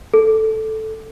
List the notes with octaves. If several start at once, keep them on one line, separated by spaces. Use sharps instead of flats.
A4